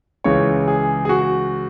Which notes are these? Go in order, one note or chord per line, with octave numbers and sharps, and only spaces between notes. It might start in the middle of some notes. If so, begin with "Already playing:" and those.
C#2 C#3 E3 C#5
G#4
G#4
F#4